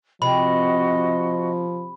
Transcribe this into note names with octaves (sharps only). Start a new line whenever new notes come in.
C3 F3 F#4 D#5 B5